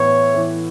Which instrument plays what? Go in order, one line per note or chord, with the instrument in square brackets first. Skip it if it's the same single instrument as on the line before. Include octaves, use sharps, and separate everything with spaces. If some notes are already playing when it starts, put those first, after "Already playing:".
Already playing: [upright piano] A2 E3 B3 [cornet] C#5
[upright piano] E3